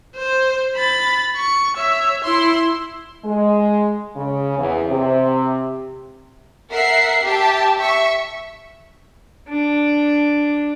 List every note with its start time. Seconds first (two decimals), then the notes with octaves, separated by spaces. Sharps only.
0.16 C5
0.76 B5 A6
1.37 C#6
1.75 C#5 E5
2.24 E4 C6
3.25 G#3
4.16 C#3
4.58 E2
4.89 C3
6.72 A#4 E5 F#5 C7
7.23 G4 E5 A5
7.78 E5 C#6
9.49 D4